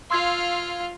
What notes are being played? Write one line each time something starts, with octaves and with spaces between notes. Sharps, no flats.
F4 F5 C6 E6 G#6